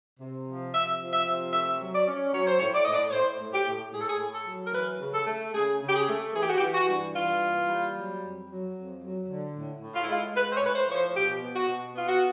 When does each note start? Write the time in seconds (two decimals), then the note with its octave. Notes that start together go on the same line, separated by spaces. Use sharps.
0.19 C3
0.46 F3
0.73 C3 E5
0.99 F3
1.13 E5
1.26 C3
1.52 A3 E5
1.80 F#3
1.93 D5
2.06 C#4
2.33 F#3 C#5
2.46 C5
2.58 A2 C#5
2.73 D5
2.83 A2 D#5
2.93 D5
3.09 C#5
3.13 A2 C5
3.40 A2
3.53 G4
3.67 A2
3.93 A2 G#4
4.01 A4
4.08 G#4
4.20 A2
4.33 A4
4.47 F#3
4.65 A#4
4.73 E3 B4
5.00 C#3
5.13 A4
5.27 A3
5.53 C#3 G#4
5.81 C#3
5.88 G4
5.94 G#4
6.07 A3
6.34 E3 G#4
6.41 G4
6.49 F#4
6.57 G4
6.61 E3
6.74 F#4
6.87 G2
7.14 E3 F4
7.40 A#3
7.68 G3
7.94 F#3
8.21 F2
8.48 F#3
8.74 F2
9.01 F#3
9.28 D3
9.54 A2
9.81 A2
9.94 F4
10.02 E4
10.07 G#3 F4
10.35 G#3 B4
10.50 C5
10.54 C#5
10.61 A2 B4
10.75 C5
10.88 F3 C#5
10.95 C5
11.15 B2 G4
11.41 B3
11.55 F#4
11.68 B2
11.95 B3 F4
12.07 F#4